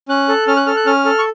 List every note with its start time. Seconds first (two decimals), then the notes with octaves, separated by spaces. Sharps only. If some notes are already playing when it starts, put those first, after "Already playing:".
0.09 C#4 F#6
0.28 A4
0.47 C#4 F6
0.57 F#6
0.66 A4 F6
0.77 F#6
0.86 C#4 F6
1.05 A4
1.19 C#6